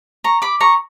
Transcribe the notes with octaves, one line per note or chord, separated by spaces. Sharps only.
A#5 C#6
B5 D6
A#5 C#6